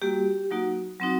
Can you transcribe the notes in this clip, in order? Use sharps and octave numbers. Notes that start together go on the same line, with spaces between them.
G3 A#3 F#4 G4
F#3 A#3 D#4 F#4
F#3 C4 D#4 F#4